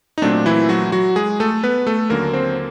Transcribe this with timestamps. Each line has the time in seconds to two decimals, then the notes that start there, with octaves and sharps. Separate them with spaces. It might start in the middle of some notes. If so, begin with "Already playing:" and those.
0.18 D#4
0.22 A#2 F#3 A3 C4 D4
0.46 E3 E4
0.69 F#3 F#4
0.92 F#3 F#4
1.16 G#3 G#4
1.40 A3 A4
1.63 B3 B4
1.87 A3 A4
2.10 D#2 D3 F#3 A#3 C#4 A#4
2.33 C4 C5